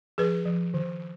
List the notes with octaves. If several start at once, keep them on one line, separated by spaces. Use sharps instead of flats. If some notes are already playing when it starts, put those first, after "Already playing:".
F3 G#4 B4
F3
D#3